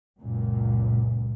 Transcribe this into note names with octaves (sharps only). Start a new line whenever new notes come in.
C#2 F#2 A#2